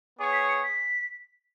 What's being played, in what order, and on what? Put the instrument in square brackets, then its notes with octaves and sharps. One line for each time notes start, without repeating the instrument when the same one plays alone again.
[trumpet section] B3 G#4 C#5
[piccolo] B6
C#7
B6